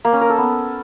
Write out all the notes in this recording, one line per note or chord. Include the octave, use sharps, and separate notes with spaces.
A#3
C#4
A#4
A4
B3